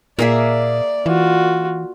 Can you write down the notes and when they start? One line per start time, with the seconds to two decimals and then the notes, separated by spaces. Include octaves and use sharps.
0.19 A#2 A#3 G#4 D5 E5
1.06 E3 F4 F#4